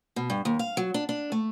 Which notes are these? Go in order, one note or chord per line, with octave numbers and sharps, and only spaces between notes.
B2
G2
D#2
F5
F#3
D4
D4
A3